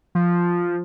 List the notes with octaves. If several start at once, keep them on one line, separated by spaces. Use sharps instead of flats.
F3